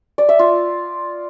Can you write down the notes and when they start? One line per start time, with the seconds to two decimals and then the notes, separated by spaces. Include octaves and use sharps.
0.18 D5
0.29 E5
0.39 F4